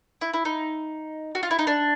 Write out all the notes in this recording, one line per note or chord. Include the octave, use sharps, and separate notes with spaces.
E4
E4
D#4
F#4
F4
E4
D#4
D4